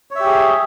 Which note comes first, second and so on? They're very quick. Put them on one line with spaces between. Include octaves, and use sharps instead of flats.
C#5 E5 G4 G#4